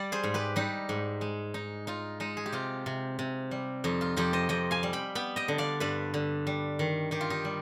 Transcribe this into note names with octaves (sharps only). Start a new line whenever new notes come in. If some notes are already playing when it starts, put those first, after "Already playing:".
Already playing: G3 D5
G#4 C5
G#2
G4 B4
G3 D#4 G4
G#2
G#3
D#4
D#4 F4
G#3 D#4
G#4
G4
C3 F4
C3
C3
G3
F2 D#4
F4
F2 D#4 G4
C5 D#5
F2 D#5 G5
F5 G#5
G3
G5 B5
B3 G5 B5
D#5 G5
D3
D5 F5
G2 B4 D5
D3
G3
D#3
D#3 G4
F4
D#4 G4
G3